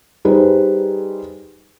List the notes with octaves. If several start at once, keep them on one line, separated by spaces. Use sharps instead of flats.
G3 D#4 G#4 B4 C5